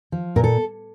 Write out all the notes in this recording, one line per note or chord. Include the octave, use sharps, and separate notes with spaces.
F3
A#2 A#4
A4